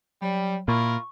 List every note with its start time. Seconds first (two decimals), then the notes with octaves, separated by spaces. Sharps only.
0.22 F#3 G3
0.68 A#2 E4 F4 A#4 C#6